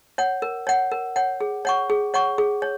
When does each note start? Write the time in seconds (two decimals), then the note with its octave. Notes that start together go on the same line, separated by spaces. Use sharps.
0.18 C#5 F#5
0.42 A#4
0.67 C#5 F#5
0.92 A#4
1.16 C#5 F#5
1.41 G#4
1.65 C#5 F#5 C#6
1.90 G#4
2.14 C#5 F#5 C#6
2.38 G#4
2.62 C#5